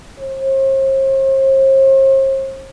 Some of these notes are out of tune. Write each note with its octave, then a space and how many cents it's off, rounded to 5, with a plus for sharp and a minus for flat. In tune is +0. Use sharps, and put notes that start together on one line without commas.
C5 +45